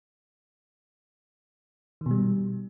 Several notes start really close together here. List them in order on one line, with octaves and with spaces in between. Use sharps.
D#3 B2 G3